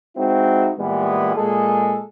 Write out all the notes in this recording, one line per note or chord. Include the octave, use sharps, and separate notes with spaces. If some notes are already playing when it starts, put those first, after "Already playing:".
G#3 C4 D#4 E4 F#4
A#2 E3 G3 G#3 B3
A#2 G#3 G#4 A4